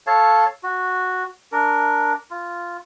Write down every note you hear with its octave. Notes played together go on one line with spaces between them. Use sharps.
A4 C#5 F5 A5
F#4
D4 A#4
F4